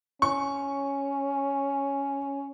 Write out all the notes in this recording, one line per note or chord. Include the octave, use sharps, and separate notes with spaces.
C#4 C#6